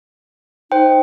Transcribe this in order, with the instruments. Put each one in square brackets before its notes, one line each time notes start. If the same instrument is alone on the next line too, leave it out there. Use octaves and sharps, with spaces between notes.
[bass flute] D#4 [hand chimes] C5 G5